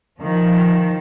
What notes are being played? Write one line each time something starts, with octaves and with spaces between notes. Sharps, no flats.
D#3 F3